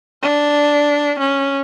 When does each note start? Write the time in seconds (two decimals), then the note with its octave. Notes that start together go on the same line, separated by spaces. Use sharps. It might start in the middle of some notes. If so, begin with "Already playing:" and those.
0.22 D4
1.19 C#4